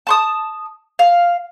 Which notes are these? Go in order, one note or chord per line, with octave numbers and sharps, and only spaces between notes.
A5 C6 D#6
F5